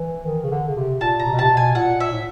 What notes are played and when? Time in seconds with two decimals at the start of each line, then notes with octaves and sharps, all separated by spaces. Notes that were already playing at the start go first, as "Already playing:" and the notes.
Already playing: E3
0.26 D#3
0.43 C#3
0.51 D3
0.68 C#3
0.76 C3
1.01 A#2 A5
1.19 A#5
1.26 C3
1.33 B2
1.39 C3 A5
1.51 B2
1.57 G#5
1.75 A#2 F#5
2.00 E5
2.13 A2